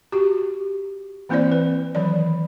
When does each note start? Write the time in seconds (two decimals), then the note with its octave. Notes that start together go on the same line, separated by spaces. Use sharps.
0.12 F#4 G4
1.29 E3 A#3 C4 E4 C5 D5
1.52 B4
1.95 D#3 E3 F#3 C#5 D5